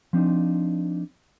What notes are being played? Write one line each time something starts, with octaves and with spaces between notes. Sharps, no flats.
F3 C4 D4 D#4